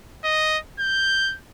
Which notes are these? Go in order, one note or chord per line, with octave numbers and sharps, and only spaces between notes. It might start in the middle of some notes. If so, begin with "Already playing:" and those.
D#5
G6